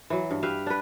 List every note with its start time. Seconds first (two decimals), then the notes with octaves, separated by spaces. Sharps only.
0.10 E3 F#3
0.31 G2
0.43 G4 B4 E5 F5
0.66 D4 B4